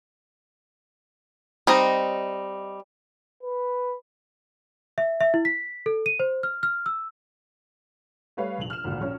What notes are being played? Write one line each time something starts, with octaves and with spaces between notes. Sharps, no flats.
G3 C4 D#4 D#5
B4
E5
E5
E4
B6
A4
D#7
C5
F6
F6
E6
G3 A3 B4 C#5 F5
F1 A#1 F7 F#7
F6 E7
G#1 D2 A#2
A#1 C#4 C#5 F6